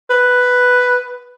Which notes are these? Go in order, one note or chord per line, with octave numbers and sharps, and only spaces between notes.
B4